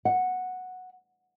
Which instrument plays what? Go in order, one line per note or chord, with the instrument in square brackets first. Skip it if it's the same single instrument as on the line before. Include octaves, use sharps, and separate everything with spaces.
[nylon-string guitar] F#5